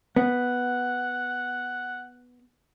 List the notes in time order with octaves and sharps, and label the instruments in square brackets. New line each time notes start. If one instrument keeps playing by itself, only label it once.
[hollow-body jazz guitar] B3 [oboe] F#5